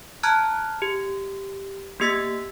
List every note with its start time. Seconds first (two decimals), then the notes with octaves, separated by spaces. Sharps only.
0.23 A5 A#5 F6 F#6 G#6
0.82 G4
2.00 A#3 B3 G4 E6 A6 B6